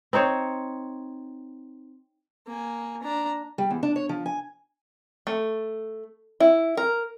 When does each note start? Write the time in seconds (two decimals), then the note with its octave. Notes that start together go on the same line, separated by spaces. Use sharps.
0.13 C4 D#4 C5 C#5
2.47 A#3 G#5
3.02 D4 A#5
3.58 G3
3.70 E2
3.83 D4
3.96 C#5
4.09 F3
4.26 G#5
5.27 A3
6.40 E4
6.77 A#4